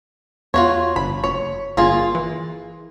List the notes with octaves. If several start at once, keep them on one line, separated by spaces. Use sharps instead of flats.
E2 F4 F#4 C#5
G1 B5
F#1 C#5
G1 A#3 F4 G#4
E3